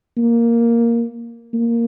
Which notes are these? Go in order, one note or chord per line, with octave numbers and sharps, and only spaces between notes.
A#3
A#3